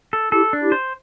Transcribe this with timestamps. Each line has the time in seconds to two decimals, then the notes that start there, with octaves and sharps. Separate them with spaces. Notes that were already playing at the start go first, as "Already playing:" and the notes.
0.13 A4
0.32 E4 G4 A4
0.53 D4
0.62 E4 G4
0.72 C5